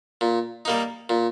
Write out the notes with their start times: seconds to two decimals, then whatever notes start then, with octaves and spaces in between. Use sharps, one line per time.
0.21 A#2
0.65 G3 A#3 D#4
1.09 A#2